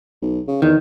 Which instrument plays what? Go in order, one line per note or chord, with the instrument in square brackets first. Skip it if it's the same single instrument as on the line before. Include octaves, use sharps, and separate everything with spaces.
[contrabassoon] B1
C#3
[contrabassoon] E2 [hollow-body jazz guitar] D#3